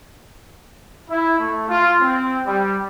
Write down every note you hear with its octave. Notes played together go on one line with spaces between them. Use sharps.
E4
A3
F4
C4
G3